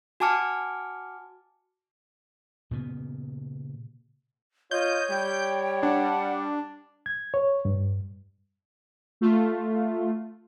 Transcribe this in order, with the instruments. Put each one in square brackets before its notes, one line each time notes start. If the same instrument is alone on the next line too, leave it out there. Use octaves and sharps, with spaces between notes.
[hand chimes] F#4 G#5 A5 D6 F6 C#7
[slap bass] A#2 C#3 B3
[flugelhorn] F4 [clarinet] C#5 [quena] D#5 [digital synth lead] G6
[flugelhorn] G3 [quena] G5
[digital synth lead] D4 [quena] F#5
[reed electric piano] G#6
C#5
G2
[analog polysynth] A3 F4